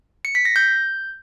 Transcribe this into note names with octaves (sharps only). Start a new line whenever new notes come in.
C#7
B6
A#6
G6